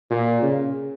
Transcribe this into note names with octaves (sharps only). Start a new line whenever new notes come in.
A#2
C#3